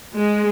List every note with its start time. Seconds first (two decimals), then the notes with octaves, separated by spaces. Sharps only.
0.17 G#3